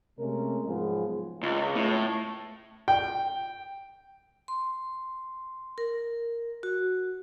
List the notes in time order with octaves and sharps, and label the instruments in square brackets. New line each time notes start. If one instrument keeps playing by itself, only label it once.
[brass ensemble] C3 G#3 A3 C#4 A#4
G#2 F3 F#3 B3 G#4
[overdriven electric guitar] C#2
A2
[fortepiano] G5
[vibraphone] C6
A#4
F#4